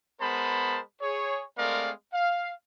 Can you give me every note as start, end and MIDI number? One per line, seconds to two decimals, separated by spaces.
0.21 0.80 56
0.21 0.80 59
0.21 0.80 70
0.21 0.80 72
0.21 0.80 81
0.21 0.80 83
1.02 1.44 68
1.02 1.44 73
1.57 1.92 56
1.57 1.92 57
1.57 1.92 60
1.57 1.92 70
1.57 1.92 74
1.57 1.92 77
2.13 2.53 77